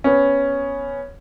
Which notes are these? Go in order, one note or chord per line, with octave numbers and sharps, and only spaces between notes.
B3 C#4